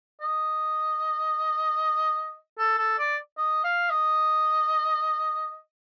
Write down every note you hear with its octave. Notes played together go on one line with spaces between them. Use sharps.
D#5
A4
A4
D5
D#5
F5
D#5